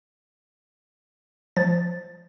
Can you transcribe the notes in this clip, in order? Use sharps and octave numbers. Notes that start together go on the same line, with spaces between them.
F3 A6